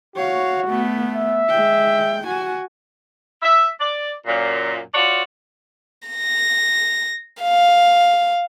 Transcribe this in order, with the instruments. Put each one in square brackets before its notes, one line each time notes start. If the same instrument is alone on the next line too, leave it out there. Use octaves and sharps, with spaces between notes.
[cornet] F#4 [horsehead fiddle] C#5 F5
[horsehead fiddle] A3 B3
[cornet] E5
[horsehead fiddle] G#3 G5
F#4 G#5
[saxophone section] E5
D5
F#2 A#2
F4 F#4 C#5 D5
[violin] A#6
F5